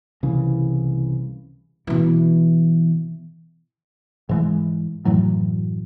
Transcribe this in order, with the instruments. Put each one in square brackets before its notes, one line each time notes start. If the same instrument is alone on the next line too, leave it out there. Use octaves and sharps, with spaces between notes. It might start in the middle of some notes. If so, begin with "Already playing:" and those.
[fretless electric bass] C2 C#3 E3
[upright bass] B2 E3
[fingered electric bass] G#2 E3 G#3
F#2 A2 E3 F#3